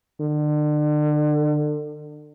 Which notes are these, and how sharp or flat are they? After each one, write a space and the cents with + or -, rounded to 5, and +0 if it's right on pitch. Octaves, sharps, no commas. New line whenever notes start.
D3 +35